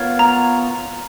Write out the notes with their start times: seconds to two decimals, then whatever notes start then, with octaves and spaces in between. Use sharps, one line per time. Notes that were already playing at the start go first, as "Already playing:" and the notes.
Already playing: B3 F4 A#4 C#5
0.19 A#5